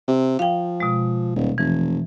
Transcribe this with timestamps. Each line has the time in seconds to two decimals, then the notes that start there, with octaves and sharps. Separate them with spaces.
0.08 C3
0.39 F3 F5 G5
0.80 B2 G#3
1.35 D#1
1.58 F1 E3